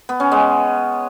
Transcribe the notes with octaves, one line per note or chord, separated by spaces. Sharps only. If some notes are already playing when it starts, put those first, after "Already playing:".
B3
C#4
G#3 B3